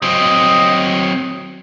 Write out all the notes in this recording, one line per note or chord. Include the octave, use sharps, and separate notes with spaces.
F#3 C4 D#5